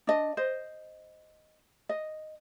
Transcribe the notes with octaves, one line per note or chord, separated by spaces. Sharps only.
D4 D#5
C5 D#5
D#5